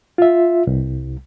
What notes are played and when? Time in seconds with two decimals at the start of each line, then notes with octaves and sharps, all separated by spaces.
0.18 F4 E5
0.67 C2